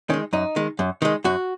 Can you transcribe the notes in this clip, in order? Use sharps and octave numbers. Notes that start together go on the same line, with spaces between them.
D#3 G#3 C#4
F#2 D#4
D#3 G#3
F#2
D#3 G#3
F#2 F#4